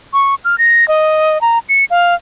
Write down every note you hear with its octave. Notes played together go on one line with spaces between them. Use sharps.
C#6
F6
A#6
D#5
A#5
C#7
F5